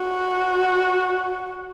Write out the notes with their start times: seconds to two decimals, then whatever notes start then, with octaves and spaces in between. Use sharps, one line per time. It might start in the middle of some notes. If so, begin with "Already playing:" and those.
Already playing: F#4